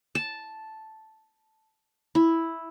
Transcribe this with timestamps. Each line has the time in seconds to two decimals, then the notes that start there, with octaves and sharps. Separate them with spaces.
0.15 A5
2.15 E4